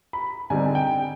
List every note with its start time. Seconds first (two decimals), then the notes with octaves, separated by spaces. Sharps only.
0.13 B5
0.50 D3 G3 C4 D#4 G#5
0.75 G5